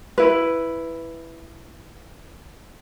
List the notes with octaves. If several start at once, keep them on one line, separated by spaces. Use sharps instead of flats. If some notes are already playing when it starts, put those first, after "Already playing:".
E4 B4